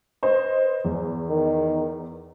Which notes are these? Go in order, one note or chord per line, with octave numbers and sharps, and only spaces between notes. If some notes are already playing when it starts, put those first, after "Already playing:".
B4 C5 D#5
E2
D#3